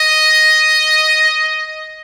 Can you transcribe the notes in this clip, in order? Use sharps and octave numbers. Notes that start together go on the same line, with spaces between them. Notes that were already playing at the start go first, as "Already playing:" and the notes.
Already playing: D#5